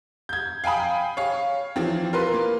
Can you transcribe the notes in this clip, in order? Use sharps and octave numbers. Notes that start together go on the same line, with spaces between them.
G6 G#6
F5 G5 G#5 B5 D#6
C#5 F5
E3 F3 C4
F4 A#4 B4 C6
A#3